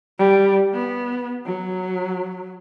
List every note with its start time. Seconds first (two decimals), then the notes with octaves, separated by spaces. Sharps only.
0.19 G3
0.74 B3
1.46 F#3